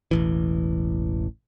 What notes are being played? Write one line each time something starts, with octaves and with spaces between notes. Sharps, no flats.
E1 A1 E3